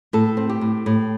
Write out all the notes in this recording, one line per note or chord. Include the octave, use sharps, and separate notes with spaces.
A2 A4
C4
G4
A2
A2